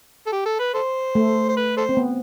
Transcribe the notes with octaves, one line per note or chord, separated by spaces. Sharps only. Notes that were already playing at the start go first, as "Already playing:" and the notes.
A4
G4
A4
B4
A4 C5
A3
C5
B4
A4 C5
C4
B3